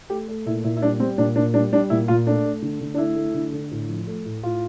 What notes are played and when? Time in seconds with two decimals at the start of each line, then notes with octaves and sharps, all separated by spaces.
0.10 A3 G4
0.28 A3
0.46 A#2 E4
0.64 A#2 E4
0.77 E4
0.82 G3 D4
1.00 G3 C4
1.18 A#2 D4
1.36 A#2 D4
1.54 G3 D4
1.72 G3 D4
1.90 A#2 E4
2.08 A#2 F4
2.27 A3 D4
2.45 A3
2.62 D3
2.81 D3
2.94 D4
2.98 A3 E4
3.16 A3
3.34 D3
3.52 D3
3.71 A2
3.88 F3
4.07 A3
4.25 A2
4.43 A2 F4